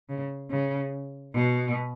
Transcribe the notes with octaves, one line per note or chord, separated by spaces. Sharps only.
C#3
C#3
B2